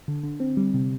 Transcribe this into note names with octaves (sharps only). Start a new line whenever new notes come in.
D3
D3
C4
G3
C3